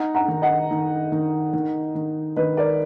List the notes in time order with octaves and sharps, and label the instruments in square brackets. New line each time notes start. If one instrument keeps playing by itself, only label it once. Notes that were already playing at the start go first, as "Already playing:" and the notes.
Already playing: [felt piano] D#4 [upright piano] F#5 A#5
[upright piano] F#5 A#5
[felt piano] D#3
[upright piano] D#5 F#5
[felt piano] D#3
D#3
D#3
D#3
[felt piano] D#3 [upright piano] B4 D#5
[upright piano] A#4 D5